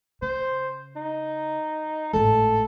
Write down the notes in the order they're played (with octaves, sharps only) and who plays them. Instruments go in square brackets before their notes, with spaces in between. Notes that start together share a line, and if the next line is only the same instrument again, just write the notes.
[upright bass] C#3 [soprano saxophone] C5
[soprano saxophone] D#4
[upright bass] G#1 A2 [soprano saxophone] A4